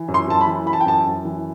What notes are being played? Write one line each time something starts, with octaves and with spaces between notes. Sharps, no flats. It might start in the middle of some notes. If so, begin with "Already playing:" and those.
Already playing: E3
F#2
C6
F#2 A5
B5
E3
E3 B5
A5
G5
F#2 A5
F#2
E3